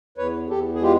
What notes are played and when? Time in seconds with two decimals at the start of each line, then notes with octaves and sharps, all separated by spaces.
0.17 E2 B4 C#5
0.50 E2 G4 A4
0.75 G#4
0.82 G#3 F4 G4